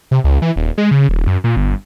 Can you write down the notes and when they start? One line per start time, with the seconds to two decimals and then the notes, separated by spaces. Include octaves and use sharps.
0.11 C3
0.24 C#2
0.42 E3
0.56 D#1
0.78 G#3
0.91 C#3
1.09 D#1
1.27 F#2
1.44 A#2
1.57 G1